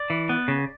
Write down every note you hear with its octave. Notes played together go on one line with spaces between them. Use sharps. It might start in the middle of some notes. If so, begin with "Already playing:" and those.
Already playing: D5
E3
B3
C#3